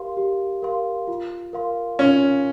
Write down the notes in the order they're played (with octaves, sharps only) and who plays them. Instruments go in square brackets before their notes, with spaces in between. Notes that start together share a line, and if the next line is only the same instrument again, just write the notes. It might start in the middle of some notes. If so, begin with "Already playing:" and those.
Already playing: [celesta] G4 A#4 F5 C6
G4
A#4 F5 C6
F4
A#4 F5 C6
[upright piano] C#4 [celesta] F4